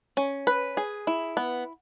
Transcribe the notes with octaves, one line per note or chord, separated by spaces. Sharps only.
C#4
B4
G#4
E4
B3